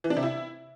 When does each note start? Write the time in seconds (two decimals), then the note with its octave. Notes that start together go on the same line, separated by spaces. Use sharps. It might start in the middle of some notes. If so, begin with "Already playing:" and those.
0.04 E3
0.10 D4
0.16 C3
0.23 E4